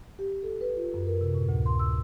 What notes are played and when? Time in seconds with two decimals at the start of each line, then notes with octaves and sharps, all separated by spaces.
0.19 G4
0.43 A4
0.61 B4
0.76 F4
0.94 F#2
1.06 A#4
1.21 C3
1.35 A2
1.49 D2
1.66 C6
1.79 E6